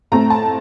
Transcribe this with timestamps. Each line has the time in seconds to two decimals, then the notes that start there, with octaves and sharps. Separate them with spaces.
0.12 A2 A3 C4 A#5
0.30 A5